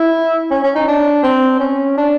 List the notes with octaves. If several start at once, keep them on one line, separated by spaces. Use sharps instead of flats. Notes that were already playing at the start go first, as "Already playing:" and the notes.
Already playing: E4
C#4
C#4
D#4
D4
C4
C#4
D4